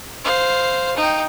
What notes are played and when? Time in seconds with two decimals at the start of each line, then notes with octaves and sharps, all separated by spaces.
0.24 C5 F5
0.97 D#4 G5